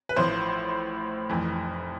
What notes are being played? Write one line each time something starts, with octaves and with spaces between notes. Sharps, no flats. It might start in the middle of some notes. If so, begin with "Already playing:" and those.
B4
A1 A2 F3 C5
F1 F2 E3